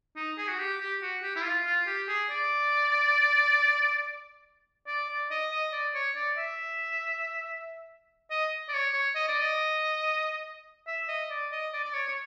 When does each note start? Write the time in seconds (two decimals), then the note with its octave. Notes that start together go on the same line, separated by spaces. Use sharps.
0.16 D#4
0.38 G#4
0.48 F#4
0.59 G4
0.81 G4
1.02 F#4
1.22 G4
1.36 E4
1.44 F4
1.65 F4
1.87 G4
2.08 G#4
2.30 D5
4.87 D5
5.08 D5
5.31 D#5
5.51 D#5
5.73 D5
5.95 C#5
6.15 D5
6.37 E5
8.31 D#5
8.69 D5
8.74 C#5
8.94 C#5
9.15 D#5
9.28 D5
9.41 D#5
10.87 E5
11.08 D#5
11.30 D5
11.52 D#5
11.73 D5
11.85 D5
11.94 C#5
12.08 C#5